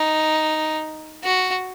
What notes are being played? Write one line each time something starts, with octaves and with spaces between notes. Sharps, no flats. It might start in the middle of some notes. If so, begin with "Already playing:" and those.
Already playing: D#4
F#4